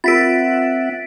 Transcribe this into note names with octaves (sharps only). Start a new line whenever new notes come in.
C4 F4 A#4 E5 F#5 A6 B6 D7